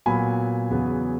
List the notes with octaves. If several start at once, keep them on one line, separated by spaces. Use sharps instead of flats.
A#2 F#3 B3 G#5 B5
E2 C#3 F#3 B3